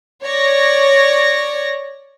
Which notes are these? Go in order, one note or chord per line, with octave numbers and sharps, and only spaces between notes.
C#5 D5 A#6